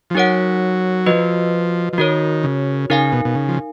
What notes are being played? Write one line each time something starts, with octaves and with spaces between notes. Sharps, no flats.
F3
F#3 D#4 A#4 C#5 F#5
F3 F#4 B4 D#5
F3
D#3 F#4 A#4 C#5
C#3
C#3 D#4 A#4 F5 G#5
B2
B2
C#3
F3